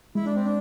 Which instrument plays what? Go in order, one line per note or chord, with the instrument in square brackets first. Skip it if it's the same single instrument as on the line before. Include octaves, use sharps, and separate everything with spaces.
[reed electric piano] G#3 [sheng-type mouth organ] E4
[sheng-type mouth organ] D4
C4
D4